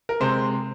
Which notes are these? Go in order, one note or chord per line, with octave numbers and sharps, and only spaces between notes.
A#4
C3 G#3 C5